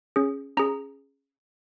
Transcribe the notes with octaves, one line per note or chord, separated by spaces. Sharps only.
C#4 G#4
C#4 G#4 A#5